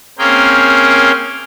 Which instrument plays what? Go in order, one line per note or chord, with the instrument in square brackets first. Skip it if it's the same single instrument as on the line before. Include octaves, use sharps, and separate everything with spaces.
[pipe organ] A#3 C4 C#4 G#4 A#4 G5